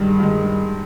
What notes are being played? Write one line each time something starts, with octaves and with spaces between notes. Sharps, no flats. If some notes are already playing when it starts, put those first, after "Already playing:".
Already playing: G2 D#3 G3 G#3
G2 D#3 G#3